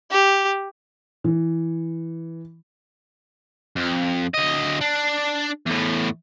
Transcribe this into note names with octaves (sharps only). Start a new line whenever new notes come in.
G4
E3
F2
D2 D#5
D4
E2 A2